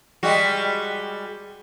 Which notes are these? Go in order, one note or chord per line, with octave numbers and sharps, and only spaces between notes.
G3 G#3 F#4